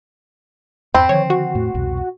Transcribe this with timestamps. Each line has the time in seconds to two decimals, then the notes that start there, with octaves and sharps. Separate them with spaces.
0.94 E2 G2 C4 B5
1.09 D3 D#3 F3 C#5
1.30 F#4
1.55 E2 A2 A3
1.74 C2 F2 B2